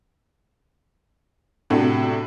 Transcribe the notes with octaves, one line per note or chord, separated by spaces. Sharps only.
A2 C3 D4 F#4